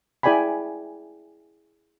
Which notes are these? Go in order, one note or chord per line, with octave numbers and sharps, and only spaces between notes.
E4 G#4 D5 G5 G#5 B5